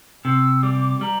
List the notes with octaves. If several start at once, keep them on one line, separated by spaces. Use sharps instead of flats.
C3 E6
G3 D6
G3 A#5